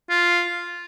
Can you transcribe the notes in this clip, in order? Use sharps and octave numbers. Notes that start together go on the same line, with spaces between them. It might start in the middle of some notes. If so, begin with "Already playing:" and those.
F4